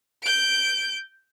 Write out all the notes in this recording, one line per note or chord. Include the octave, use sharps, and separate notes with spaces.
G6 D7